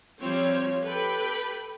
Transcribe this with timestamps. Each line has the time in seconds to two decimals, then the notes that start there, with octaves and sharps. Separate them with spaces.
0.21 F3 G3 C4 F4 C#5
0.84 G4 A4 B4 G5 B5